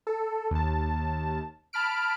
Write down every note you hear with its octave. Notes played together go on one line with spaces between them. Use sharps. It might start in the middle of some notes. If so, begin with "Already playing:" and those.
A4
D#2 A5
A5 B5 F6 D7